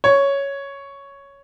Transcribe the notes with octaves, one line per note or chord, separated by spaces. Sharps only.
C#5